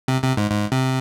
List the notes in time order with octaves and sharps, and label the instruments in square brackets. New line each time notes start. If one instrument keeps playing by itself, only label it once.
[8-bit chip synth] C3
C3
G#2
G#2
C3